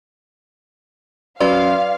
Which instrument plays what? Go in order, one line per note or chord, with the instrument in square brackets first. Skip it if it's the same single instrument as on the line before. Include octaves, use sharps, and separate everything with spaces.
[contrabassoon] F#2 [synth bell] F#4 B4 C6 [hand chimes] D5 [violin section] F5